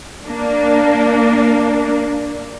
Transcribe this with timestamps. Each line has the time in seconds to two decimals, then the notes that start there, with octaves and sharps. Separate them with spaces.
0.25 A#3 D4